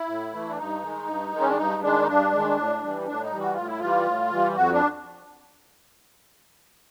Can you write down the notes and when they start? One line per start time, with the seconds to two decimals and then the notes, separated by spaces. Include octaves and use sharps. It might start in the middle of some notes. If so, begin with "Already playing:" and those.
Already playing: E4
0.08 A2
0.33 E3 A3
0.49 D4
0.58 G2 D#4
0.83 D#3 G#3
1.08 G2
1.33 D#3 G#3
1.40 C#4
1.49 D4
1.57 G2 D#4
1.83 D#3 G#3 D4
2.03 D#4
2.07 G2 D4
2.32 D#3 G#3
2.57 A2
2.82 E3 G3
3.07 A2 D4
3.23 D#4
3.32 E3 G3
3.40 F#4
3.54 A2 F4
3.67 E4
3.80 E3 G3 F4
4.06 A2
4.31 E3 G3
4.56 F2 F#4
4.73 D4